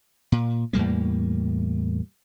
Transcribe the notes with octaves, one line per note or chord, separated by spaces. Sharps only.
A#2
E2 A2 G3 A#3